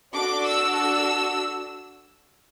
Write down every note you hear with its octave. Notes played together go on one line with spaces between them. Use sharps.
D4 F#4 A4 D6
E6
E6